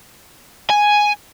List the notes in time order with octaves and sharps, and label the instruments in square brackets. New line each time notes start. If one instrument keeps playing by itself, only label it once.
[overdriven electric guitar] G#5